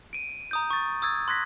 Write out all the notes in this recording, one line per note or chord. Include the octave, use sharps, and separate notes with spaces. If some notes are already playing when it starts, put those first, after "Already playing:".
D7 D#7
A#5 D#6 G6
C#6 A6
D#6 E6 G#6 A6
C6 F#6 G#6 A#6 B6